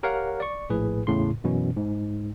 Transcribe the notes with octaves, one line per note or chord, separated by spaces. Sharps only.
G4 A#4 C#5 F5 F#5
D5 C#6
A#1 A2 G#4 B4
E2 A2 C#3 C6
F#2 B2 E3 C#4
G#2